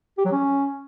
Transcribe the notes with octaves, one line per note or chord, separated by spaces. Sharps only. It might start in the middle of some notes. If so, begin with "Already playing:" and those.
G4
F#3
C#4